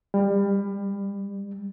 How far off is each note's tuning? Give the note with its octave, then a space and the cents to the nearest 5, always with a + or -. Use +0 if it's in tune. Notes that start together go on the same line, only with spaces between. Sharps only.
G3 +30